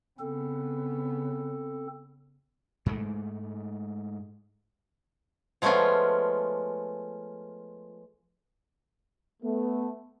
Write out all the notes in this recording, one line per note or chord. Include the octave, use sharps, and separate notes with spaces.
C#3 B3 C4 A4
G#2 G#3 A3
F3 G#3 A3 B3 C#4 F4
A3 B3